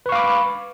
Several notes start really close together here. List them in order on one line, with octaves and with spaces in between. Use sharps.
B4 C#6 F5 D6 B5